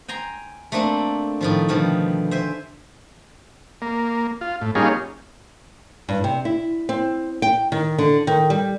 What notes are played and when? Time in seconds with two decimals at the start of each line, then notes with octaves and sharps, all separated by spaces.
0.08 G5 G#5 A#5 C6
0.72 A3 A#3 C4 D4 A4
1.41 A2 D#3 F3
1.69 B2 D3 D#3 F3 G3
2.31 C5 E5 G5 G#5
3.82 A#3
4.41 F4
4.61 A2
4.75 G3 A#3 C#4 D#4 F4 G#4
6.09 G2
6.24 C3
6.45 E4
6.89 C4
7.42 G5
7.72 D#3
7.98 D3
8.27 D#3
8.50 G3